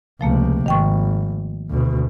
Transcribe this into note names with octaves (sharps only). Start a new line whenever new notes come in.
C#2 C3 F3 A3 A#3
G#1 D#3 G5 C#6
D2 B2